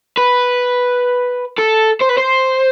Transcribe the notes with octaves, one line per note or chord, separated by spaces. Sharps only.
B4
A4
C5
B4
C5